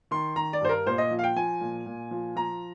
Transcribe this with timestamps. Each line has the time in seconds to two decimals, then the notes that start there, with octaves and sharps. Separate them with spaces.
0.11 D#3 C6
0.36 D#3 A#5
0.53 D5
0.61 G2 C5
0.69 A#4
0.86 A#2 C5
0.98 D#5
1.11 F3
1.19 F5
1.24 G5
1.36 F3 G#5
1.61 A#2
1.86 A#2
2.11 F3
2.36 F3 A#5